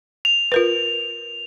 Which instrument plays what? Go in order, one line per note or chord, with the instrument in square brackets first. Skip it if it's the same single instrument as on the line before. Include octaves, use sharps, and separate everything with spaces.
[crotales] F7
[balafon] F4 A#4 B4